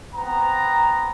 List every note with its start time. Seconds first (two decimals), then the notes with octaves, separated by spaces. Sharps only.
0.14 B3 C4 A#5